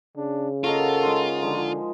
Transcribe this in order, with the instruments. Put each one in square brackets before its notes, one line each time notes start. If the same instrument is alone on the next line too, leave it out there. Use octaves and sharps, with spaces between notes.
[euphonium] C#3 [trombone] D4
[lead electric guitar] F4 [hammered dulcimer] F#4 A#4 D#5 [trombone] A4
[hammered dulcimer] G#3 D#4 C5
[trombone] D3 [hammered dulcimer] F3 G#3